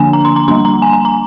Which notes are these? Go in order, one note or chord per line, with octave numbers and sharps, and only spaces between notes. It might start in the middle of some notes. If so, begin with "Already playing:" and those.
Already playing: D3 F3 A#3 D4 G#5
A#5
C6
A#5
G3 A#3 D4 C6
A#5
G#5
G#5
A#5